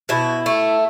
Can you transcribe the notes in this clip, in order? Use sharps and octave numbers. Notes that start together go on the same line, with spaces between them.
B2 E4
A3